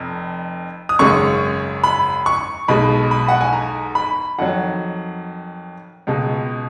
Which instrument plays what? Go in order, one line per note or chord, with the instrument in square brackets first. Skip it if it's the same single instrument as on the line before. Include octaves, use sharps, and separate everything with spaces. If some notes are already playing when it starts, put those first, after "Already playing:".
Already playing: [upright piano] F1 F2
D#6
G#1 F#2 C#3 G#3 C#6
B5
C#6
B1 B2 G#3 B5
B5
F#5
G#5
A#5
B5
F2 D#3 F#3 F#5
C#2 B2 G#3